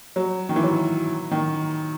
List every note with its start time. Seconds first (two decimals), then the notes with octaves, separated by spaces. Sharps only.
0.16 F#3
0.49 D#3
0.56 E3
0.64 F#3
1.31 D#3